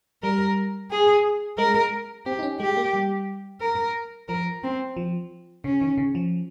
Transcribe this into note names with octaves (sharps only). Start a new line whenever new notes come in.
G3 A#4
G#4
G#3 A#4
C4 G4
D#4
C#4
G#3 G4
A#3
G3
A#4
F3 A#4
C4
F3
C#3 C#4
D#3
C#3
F3